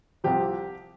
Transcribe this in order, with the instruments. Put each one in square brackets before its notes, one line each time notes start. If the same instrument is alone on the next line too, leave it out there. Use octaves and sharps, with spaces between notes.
[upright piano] C2 C3 F3 G4